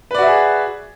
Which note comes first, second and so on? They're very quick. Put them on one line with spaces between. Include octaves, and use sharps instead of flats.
B4 D5 F#4 E5 G#4